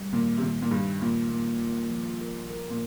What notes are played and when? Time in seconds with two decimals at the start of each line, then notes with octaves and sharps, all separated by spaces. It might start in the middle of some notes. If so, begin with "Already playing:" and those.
Already playing: G3
0.13 A#2 D#3
0.38 C3
0.42 A#2 D#3
0.62 A#2
0.71 G2 D#3
1.01 A#2 F4
1.31 A#3
1.60 F4
1.90 F3
2.21 A#4
2.50 A#4
2.70 A#2